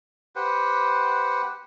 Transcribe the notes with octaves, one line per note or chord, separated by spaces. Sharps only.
G4 B4 C5 F#5